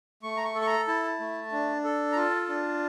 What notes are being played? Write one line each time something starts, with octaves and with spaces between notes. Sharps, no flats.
A3 C#6
A#5
C#6
A4
C#6
A#5
E4 A5
A3
D4
A4
A#5
F4 A5
D4